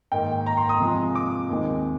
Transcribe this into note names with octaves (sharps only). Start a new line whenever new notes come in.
G#2 D#3 A#3 G5
A#5
C6
D#6
C3 F3 G#3
D6
D#2 D#3 G#3 C4